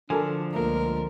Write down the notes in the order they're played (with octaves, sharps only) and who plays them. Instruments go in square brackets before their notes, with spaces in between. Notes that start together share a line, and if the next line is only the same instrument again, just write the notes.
[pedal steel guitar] D3 F3 [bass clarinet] D4 [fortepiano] A4 A#4 G#5
[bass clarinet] C#2 [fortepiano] A3 A#3 [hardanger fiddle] A#4